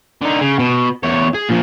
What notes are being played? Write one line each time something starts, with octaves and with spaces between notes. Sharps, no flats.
D3 D#4
C#3
B2
E2 C#5
G#4
A#2 F3